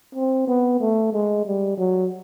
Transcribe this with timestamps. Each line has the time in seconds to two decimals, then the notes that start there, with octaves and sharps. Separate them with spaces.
0.15 C4
0.48 B3
0.80 A3
1.13 G#3
1.46 G3
1.78 F#3